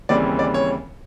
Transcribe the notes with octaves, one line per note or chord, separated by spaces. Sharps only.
D#2 C#3 E3 G3 C4 D5
D5
C#5